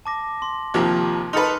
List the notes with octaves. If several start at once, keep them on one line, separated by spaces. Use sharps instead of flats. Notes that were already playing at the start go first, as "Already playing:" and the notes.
A5 D6 A#6
C6
D#2 C3 F3
D#4 A4 B4 C6 F6 C#7